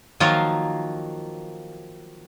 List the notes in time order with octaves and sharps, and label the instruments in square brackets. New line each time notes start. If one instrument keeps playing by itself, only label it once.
[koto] D#3 F3 F#3 A#3 F4